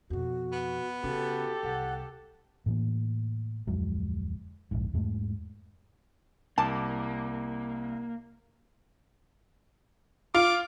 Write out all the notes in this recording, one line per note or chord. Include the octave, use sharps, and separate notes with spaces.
F2 B2 F#4
B3
C#3 F#4 G4 A4
C2 F#5
A2 E3 A#3
D1 F2 F#3 G#3
D#1 A#1 G#2
E2 G#2 G#3 A3
C2 A#3 A5 D6
F4 D6